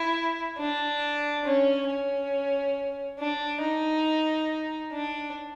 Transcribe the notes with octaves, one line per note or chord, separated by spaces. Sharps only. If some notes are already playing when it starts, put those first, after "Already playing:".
Already playing: E4
D4
C#4
C#4
D4
D#4
D4